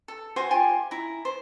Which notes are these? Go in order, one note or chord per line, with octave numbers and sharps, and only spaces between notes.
A4
F#4 C5 G#5 C#6
F4 G4 G#5 C6
E4 A#5
C5